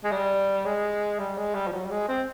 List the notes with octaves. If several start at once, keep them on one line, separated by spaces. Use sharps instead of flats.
G#3
G3
G#3
G3
G#3
G3
F3
F#3
G3
G#3
C4